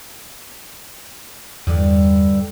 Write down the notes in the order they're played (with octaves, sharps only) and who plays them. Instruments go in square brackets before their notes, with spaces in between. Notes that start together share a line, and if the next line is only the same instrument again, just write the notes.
[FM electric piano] E2 [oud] G2 D3